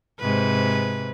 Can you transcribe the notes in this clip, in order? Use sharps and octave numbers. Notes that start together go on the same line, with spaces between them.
G#2 C3 B4